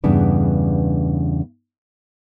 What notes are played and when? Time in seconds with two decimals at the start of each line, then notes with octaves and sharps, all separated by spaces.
0.04 E2 G2 C#3 B3 D4 B4